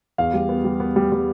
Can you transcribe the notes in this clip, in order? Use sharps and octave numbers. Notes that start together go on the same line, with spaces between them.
E2 F5
G3
B3
G3
B3
G3
G3